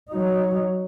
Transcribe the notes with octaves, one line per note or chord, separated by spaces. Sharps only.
F#3 D#4